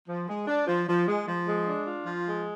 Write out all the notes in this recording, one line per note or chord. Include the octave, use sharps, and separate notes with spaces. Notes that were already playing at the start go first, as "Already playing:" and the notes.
F3
G#3
D4
F3
F3
G#3
F3
G#3
D4
F4
F3
G#3